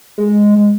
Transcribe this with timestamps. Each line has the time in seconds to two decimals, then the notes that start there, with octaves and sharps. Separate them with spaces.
0.18 G#3